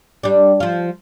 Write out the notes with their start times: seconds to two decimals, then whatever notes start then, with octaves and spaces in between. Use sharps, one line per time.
0.23 G3 D4
0.60 F3 F4